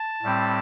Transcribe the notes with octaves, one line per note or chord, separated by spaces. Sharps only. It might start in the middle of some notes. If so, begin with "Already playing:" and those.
Already playing: A5
A2 G3 C4